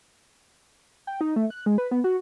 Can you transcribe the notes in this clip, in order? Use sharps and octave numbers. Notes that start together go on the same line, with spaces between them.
G5
D#4
A3
F#6
G#3
B4
B3
F#4